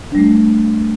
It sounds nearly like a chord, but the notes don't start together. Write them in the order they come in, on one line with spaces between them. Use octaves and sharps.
D4 G3 A3